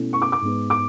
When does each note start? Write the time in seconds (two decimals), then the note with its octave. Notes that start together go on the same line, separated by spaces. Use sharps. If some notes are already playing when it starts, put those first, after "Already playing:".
Already playing: B2 A3 C#4 E4
0.13 C#6
0.22 D6
0.32 D6
0.41 G#2 G#3 B3
0.70 D6